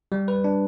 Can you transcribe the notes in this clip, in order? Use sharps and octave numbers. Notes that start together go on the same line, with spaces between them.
G3
B4
D4